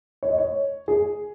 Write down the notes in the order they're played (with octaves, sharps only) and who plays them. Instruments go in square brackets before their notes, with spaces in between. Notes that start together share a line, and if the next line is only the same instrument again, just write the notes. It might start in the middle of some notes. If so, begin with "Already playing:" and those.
[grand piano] C#5
D#5
C#5
G#4